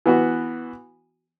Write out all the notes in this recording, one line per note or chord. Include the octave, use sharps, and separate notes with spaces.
E3 B3 F#4